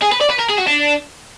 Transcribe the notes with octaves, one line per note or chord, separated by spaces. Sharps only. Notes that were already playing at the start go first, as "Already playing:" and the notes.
G#4
B4
D5
B4
A#4
G#4
F#4
D4